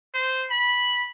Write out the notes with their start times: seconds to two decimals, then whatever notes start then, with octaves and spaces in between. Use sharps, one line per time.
0.14 C5
0.50 B5